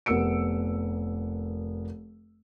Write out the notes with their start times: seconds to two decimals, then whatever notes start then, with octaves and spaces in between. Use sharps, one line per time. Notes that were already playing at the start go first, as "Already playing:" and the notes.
0.06 F1 B3 A#4 E6 C#7 D7